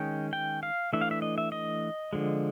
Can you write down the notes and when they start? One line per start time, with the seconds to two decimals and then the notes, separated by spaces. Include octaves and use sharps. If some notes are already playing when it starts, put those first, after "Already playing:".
Already playing: D#3 G#3 C#4 G5
0.33 G5
0.63 F5
0.93 E3 A3 D4 E5
1.01 F5
1.11 E5
1.22 D#5
1.38 E5
1.52 D#5
2.13 D3 F3 G#3